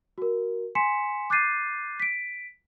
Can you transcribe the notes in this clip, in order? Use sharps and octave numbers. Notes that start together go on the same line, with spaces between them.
F#4 A#4
G#5 C6 B6 C#7 E7
D6 F#6 G6 A6 C7 D#7
B6 D7